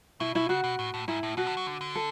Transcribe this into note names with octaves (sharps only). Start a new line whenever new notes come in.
B2 E4
B2 E4
C#3 F#4
B2
A2
A2
G#2 E4
A2
B2 F#4
D3
F#3
D3
D3
A4